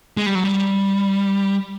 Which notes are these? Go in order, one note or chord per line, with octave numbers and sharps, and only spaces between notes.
G#3
G3
F#3
G3